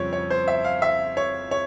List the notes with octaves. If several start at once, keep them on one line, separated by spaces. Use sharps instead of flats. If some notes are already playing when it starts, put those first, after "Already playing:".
Already playing: F2 C#3 G3 C4 C#5
C#5
C5
E5
F5
E5
C#5
C#5